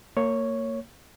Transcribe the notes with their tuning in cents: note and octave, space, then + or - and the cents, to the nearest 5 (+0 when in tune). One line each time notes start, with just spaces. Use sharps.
A#3 -25 C#5 +0